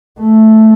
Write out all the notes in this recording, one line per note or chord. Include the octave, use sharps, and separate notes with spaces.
A3